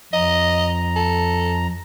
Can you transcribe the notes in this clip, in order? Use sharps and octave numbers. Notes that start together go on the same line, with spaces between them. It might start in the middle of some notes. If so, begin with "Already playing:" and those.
F2 D#5 A#5
A4